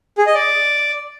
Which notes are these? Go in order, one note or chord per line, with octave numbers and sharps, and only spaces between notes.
G#4
D#5
D5